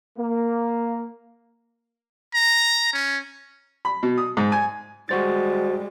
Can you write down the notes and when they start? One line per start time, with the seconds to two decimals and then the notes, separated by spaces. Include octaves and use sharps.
0.17 A#3
2.34 A#5
2.93 C#4
3.85 B5
4.03 B2
4.18 D#6
4.37 G#2
4.52 G#5
5.09 G3 G#3 F#4 C5 A6